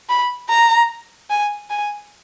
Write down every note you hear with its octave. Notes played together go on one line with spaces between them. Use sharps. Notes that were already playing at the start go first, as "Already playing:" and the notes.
B5
A#5
G#5
G#5